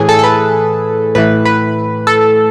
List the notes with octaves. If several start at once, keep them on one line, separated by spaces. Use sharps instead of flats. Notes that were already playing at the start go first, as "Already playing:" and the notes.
Already playing: A2 E3 G#4
A4
A4
B4
A2 E3 B4
B4
A4